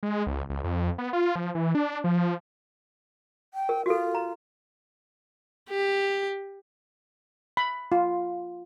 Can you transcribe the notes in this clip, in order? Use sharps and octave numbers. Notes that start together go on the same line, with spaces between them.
G#3
C#2
C#2
F2
B3
F4
F3
E3
D4
F3
G5
A#4
F4 F#4 A4
A#5
G4
B5
F4